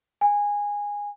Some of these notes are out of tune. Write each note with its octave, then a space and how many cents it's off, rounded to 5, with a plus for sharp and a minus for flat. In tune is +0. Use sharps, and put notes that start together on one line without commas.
G#5 -15